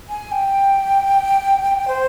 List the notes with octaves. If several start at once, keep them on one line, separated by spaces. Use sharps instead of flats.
G#5
G5
C5